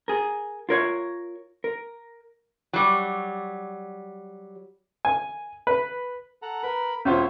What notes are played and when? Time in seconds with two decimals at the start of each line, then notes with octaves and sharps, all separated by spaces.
0.08 G#4 A#4
0.69 F4 A#4 C#5
1.64 A#4
2.73 F#3 G3
5.05 G#5
5.67 B4
6.42 A4 F#5 A#5
6.63 A#4 B4 B5
7.05 E1 C#4 F4 C5 C#5 E5